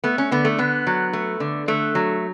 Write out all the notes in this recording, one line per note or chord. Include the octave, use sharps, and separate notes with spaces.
A3 B3
C#4
D3 B3
A3
D3 B3
F#3
A3
D3
D3 A3
F#3